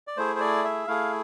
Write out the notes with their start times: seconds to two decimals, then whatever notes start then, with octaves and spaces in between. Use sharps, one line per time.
0.07 D5
0.17 A3 E4 G#4 C5
0.35 C5
0.40 D5
0.64 E5
0.87 A3 E4 G#4 F5